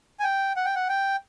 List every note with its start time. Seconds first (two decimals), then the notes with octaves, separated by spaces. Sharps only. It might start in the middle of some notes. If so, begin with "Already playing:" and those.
0.20 G#5
0.24 G5
0.56 F#5
0.65 G5
0.75 F#5
0.89 G5